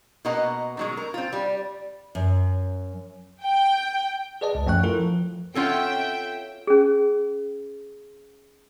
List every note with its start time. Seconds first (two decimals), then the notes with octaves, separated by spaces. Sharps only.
0.25 B2 A#3 A#4 D#5 F#5 A#5
0.77 D#3 F#3 G#3
0.97 A#4
1.14 C4 F4
1.33 G3
2.15 F#2
3.43 G5
4.41 G#4 B4 D5 D#5 A5
4.55 C#2
4.66 F#2 F3 A3 G5 C#6 F#6
4.83 E4 F4 A4 A#4
5.00 F3
5.55 C4 C#4 F4 A4 C#5 E5 F#5 G5
6.67 C#4 G#4